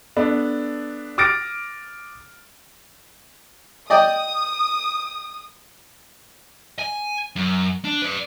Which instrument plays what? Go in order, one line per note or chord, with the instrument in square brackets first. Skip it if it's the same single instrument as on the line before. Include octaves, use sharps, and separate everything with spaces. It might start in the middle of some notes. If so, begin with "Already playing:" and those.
[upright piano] B3 D4 A4
D6 D#6 F6 A6 A#6 D7
[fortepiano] D5 D#5 G5 [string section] D#6
[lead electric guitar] G#5
F#2
D4
B4 D5